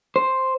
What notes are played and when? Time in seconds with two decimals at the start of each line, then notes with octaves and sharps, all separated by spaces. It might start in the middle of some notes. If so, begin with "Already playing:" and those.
0.16 C5